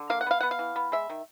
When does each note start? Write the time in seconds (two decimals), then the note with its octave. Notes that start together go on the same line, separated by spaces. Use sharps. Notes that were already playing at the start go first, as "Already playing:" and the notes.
Already playing: D3
0.10 A#3 F5
0.21 F#5
0.26 B3 F5
0.41 B3 F#5
0.51 F5
0.59 E3
0.76 B3
0.92 G#3 E5
1.10 D#3